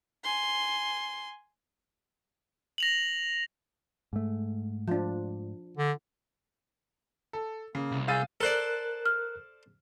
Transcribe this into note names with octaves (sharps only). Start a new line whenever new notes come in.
G#5 C6
A#6 F7 F#7
G#2 A3
F3 D4
D3
A4
C#3 A#3
C2
G#4 F5 E6 G6 A6 D#7
A4 A#4 C5 D5 F#6
F6